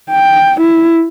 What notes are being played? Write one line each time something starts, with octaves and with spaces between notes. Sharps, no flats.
G5
E4